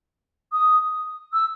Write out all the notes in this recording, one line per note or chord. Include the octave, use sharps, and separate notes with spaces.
D#6
E6